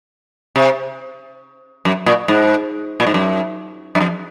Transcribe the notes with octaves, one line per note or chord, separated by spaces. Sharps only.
C3
F#2
A#2
G#2
A#2
G#2
F#2
F#2
F2